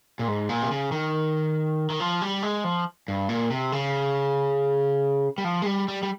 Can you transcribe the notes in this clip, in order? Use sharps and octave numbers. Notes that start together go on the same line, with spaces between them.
A#2
G#2
A#2
C3
C#3
D#3
D#3
F3
G3
G#3
F3
G2
A#2
C3
C#3
G3
F3
G#3
G3
G3
G3